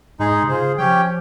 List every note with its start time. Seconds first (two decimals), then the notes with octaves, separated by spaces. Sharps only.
0.19 G#2 G#3 D#4 G#4
0.43 C3
0.48 C#3 F4 G#4 C5
0.78 F3 C#4 G4 C#5 G5